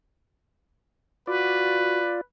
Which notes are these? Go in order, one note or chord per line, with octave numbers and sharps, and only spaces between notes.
F4 F#4 B4 D5